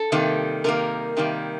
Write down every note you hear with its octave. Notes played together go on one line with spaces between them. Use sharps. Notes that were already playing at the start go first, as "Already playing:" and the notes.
Already playing: A4
C3 D#3 G3 A#3
C3 D#3 G3 A#3 A#4
C3 D#3 G3 A#3